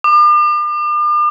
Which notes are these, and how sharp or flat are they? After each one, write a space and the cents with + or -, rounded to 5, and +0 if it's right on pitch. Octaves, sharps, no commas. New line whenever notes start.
D6 +40